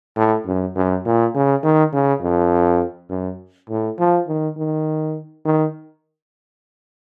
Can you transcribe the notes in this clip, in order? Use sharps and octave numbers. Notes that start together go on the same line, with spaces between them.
A2
F#2
F#2
A#2
C#3
D#3
C#3
F2
F#2
A2
F3
D#3
D#3
D#3